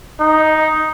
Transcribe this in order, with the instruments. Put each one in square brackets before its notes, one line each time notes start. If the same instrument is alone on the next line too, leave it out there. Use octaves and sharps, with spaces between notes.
[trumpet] D#4